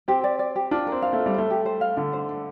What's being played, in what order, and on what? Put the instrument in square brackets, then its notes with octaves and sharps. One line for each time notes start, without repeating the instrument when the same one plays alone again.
[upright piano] C4 [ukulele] G4
[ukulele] D5
D5
G4
[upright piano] D4 [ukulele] F4
[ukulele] A#4
[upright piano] C4
[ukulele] F5
[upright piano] A3
[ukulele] F4
[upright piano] G3
[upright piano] A3 [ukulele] C5
[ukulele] G4
C5
F5
[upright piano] D3 [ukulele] D4
[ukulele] C5
D4